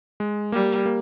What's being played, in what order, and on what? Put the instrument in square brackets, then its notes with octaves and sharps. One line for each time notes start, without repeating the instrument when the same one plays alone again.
[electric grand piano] G#3
[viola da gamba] G3 [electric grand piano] A#3
[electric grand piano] A#3